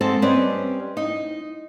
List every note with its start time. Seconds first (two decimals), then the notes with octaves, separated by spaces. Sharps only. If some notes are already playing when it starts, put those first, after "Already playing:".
0.01 G#2 C4 A4 C5 A5
0.22 G3 C4 C#4 B4 D5 D#5
0.97 D#4